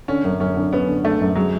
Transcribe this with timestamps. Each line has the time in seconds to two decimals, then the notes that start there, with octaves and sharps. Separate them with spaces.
0.08 D3 C#4
0.24 F#2
0.40 F#2 C#4
0.56 D3
0.73 B3 C#4
0.88 D3
1.04 D3 A3
1.21 F#2
1.35 F#3 G#3